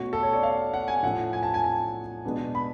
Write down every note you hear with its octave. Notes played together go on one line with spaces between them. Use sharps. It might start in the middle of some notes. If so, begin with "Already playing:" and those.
Already playing: B2 A3 C#4 F#4
A4
C#5
D5
F5
F#5
G#5
A2 F3 A3 C#4 F#5
G#5
A5
G#5
A5
B2 G#3 B3 D4
B5